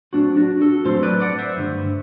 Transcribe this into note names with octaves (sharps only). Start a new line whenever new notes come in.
A2 F#3 A3 C4 D4 F#4
D4 F#4
F#4 A4
A2 F#3 A3 C4 A4 C5
B4 D5
D5 F#5
C5 E5
G2 D3 A3